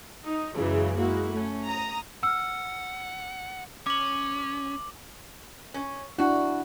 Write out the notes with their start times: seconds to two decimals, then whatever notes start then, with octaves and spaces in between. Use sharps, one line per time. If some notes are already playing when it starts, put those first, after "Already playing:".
0.25 D#4
0.53 F#2 C#3 E3 F#3 G#3
1.00 G#3 A#3 E4 F#4
1.31 A3 C#4
1.66 A#5 D#6
2.23 F#5 E6 F6
3.87 C#4 D6 F#7
5.74 C#4
6.18 D4 E4 F#4